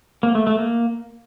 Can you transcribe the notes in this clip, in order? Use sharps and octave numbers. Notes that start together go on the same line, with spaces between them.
A#3
A3
A3
A#3